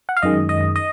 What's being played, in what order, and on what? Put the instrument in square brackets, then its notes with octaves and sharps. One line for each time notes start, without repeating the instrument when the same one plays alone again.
[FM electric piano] F#5
F5
F#2 D#3 G#3 D#5
D#5
D#5